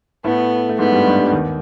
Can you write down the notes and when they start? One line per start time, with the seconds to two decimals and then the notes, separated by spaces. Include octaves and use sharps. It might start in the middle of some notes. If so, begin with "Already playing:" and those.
0.24 A2 A3 B3
0.69 A3
0.79 G#2 G#3 B3
0.92 G2 G3
1.06 G2 G3
1.19 G2 G3
1.32 D#2 D#3